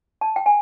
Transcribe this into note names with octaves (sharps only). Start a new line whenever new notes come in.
A5
G5
G#5